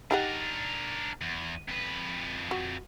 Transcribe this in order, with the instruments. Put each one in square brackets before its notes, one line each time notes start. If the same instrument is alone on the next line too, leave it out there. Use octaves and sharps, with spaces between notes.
[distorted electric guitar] D4 A#4 [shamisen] D#4 G4 F#5
[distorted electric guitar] E2
F2 B4
[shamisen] F#4